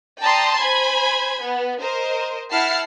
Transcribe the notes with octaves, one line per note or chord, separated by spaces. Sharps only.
D5 G5 A5 A#5 C6 D#6
C5 G#5 B5 G#6
B3
A#4 C5 D#5
E4 F#5 A5 F6 C7